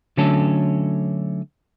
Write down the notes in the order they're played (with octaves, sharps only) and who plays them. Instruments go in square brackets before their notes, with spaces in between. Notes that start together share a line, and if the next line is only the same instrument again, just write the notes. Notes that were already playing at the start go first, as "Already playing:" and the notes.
[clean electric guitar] D3 F#3 A3 C#4 A4